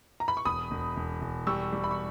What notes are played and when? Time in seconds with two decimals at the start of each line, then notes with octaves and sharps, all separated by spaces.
0.20 A#5
0.28 B5
0.37 C#6
0.45 E1 B5 D#6
0.71 E1
0.97 E1
1.22 E1
1.47 G3 C#6 E6
1.72 G3
1.84 B5
1.91 C#6